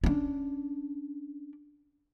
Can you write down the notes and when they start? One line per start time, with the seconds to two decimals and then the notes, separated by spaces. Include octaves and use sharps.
0.04 C#4 D4